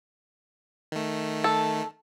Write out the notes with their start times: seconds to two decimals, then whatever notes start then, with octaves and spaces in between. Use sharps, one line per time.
0.92 D#3 A3
1.44 A4